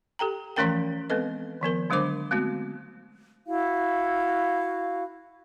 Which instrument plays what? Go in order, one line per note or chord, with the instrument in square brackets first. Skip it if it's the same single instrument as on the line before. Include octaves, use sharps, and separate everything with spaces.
[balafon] G4 A4 G5 A#5
E3 F3 A3 C#4 A#4 G5
G#3 B3 C4 A4 B4 D#5
D#3 F3 B3 A#4
D3 F#3 G#3 D4 C5 D6
G#3 A3 B3 C4 F#4
[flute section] E4 F#4 F5